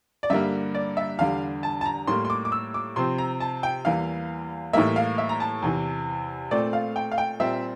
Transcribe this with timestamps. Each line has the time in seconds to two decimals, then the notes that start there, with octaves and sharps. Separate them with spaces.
0.23 D5
0.30 G2 D3 G3 A#3 E5
0.75 D5
0.97 E5
1.19 E2 D3 G3 F5
1.63 A5
1.81 A5
1.86 A#5
2.07 A2 G3 A#3 C6
2.25 C6
2.30 D6
2.45 D6
2.52 E6
2.74 D6
2.96 C3 F3 C4 C6
3.18 A#5
3.40 A5
3.63 G5
3.85 E2 E3 G3 A#3 F5
4.73 A2 E3 G3 A#3 E5
4.96 F5
5.18 E5
5.29 A#5
5.40 A5
5.62 E2 C3 E3
6.51 A#2 A3 C4 D5
6.73 F5
6.96 G5
7.12 F5
7.18 G5
7.40 A#2 G3 C4 E5